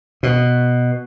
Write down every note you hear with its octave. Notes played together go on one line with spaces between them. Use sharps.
B2